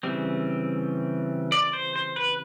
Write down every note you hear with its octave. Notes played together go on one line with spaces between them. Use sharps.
C#3 E3 G3 C4
D5
C5
C5
B4